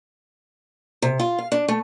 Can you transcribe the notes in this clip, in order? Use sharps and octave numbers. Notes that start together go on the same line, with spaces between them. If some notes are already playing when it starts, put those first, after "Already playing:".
C3
F4
F5
D4
A3